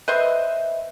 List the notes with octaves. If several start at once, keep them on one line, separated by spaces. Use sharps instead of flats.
B4 C5 D#5 E5